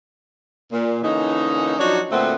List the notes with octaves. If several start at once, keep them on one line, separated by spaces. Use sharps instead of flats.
A#2
D3 E3 A#3 C#4 D#4
F3 F#3 D4 D#4 F#4 C#5
A#2 D3 A3 B3 C4